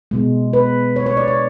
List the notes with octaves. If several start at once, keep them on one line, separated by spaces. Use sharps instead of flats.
B2 G#3
B4
C#5
C#5
D5
C#5